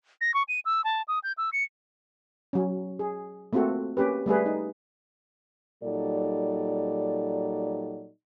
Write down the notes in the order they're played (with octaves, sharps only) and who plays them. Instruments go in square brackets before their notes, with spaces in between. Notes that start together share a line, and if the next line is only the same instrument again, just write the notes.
[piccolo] A#6
C#6
D#7
E6
A5
D#6
G6
E6
C#7
[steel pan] F#3 C#4
G#4
A3 A#3 C4 F4 F#4 A4
A#3 C#4 G4 B4
G3 A3 G#4 B4
D#4
[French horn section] A#2 F#3 G3 D#4 A4 D5